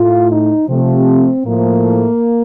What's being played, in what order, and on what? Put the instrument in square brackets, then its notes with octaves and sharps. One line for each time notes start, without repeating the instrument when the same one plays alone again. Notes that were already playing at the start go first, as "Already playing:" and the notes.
Already playing: [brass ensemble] A2 A3 F4
D#4
C3 F3 A3 C4
A2 F3 A3 A#3